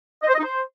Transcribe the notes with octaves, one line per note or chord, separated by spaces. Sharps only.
D#5
C5
D#5
D#4
C5